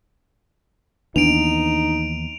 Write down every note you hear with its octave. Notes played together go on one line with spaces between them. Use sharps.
D#2 E3 B3 D4 D#4 D7 D#7 F7